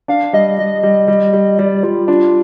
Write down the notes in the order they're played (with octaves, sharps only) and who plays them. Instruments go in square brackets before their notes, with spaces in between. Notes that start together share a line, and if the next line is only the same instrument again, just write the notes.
[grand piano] D4 [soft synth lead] F5
[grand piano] G3 [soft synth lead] D#5
[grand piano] G3 [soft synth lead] D#5
[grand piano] G3
G3
G3
[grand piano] G3 [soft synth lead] D5
[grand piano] G3 [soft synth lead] F4
[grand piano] D4 [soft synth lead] F4